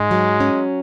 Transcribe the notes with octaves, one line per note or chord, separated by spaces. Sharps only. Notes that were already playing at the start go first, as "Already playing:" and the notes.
Already playing: G#2 G#3
F#3
C#4